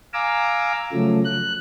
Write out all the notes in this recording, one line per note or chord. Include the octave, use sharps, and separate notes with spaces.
F5 G#5 A#5 D6 E6
C#3 F3 F#3 A3
F#6